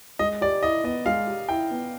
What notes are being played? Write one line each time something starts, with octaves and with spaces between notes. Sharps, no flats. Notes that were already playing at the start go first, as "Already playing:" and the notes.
G#3 D#5
G4 D5
E4 D#5
B3 D#5
G#3 F5
G4
E4 G5
B3